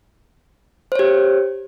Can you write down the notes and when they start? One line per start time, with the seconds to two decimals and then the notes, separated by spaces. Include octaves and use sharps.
0.92 C5
0.95 C#5
0.99 G4